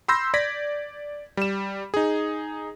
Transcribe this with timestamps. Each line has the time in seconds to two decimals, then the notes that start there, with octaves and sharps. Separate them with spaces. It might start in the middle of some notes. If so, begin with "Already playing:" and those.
0.08 B5 C6 E6 G6 A#6
0.34 D5 G#6 A#6 B6
1.37 G3 E7
1.94 D#4 G#4